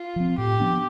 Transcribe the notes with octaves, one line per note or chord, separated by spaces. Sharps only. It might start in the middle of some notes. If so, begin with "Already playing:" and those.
Already playing: F4
F3 C4
A2 G4
F3 B3 D4